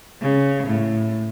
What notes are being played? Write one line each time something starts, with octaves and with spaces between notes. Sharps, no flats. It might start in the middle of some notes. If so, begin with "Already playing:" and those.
C#3
A2